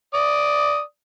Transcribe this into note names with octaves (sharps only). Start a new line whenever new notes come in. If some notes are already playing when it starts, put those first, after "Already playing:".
D5 D#6